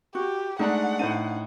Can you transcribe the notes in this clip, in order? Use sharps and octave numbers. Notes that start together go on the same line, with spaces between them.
F#4 G4
G#3 A3 D4 D#4 F#5 A#5
A2 D4 D#4 C5 D#7